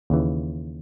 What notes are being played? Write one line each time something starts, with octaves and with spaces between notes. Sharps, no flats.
D#2 C#3 E3